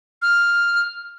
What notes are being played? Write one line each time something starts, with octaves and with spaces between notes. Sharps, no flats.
F6